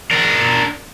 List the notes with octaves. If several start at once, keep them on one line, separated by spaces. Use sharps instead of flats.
D4 A#4